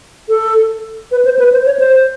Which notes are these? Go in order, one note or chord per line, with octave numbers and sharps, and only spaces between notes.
A4
B4
C5
B4
C5
C#5
C5